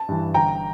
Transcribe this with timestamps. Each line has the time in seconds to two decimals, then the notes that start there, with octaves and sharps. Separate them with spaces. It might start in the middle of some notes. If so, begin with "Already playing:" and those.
Already playing: A5
0.09 G2 E3
0.34 G1 G5 A#5